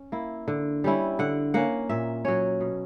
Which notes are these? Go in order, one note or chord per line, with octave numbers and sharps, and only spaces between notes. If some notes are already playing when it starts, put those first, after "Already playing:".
Already playing: C#4
A#3 E4
D3
G3 C#4 E4
D3 F#5
A#3 C#4 F#5
A#2 E5
F#3 C#4 C#5
B2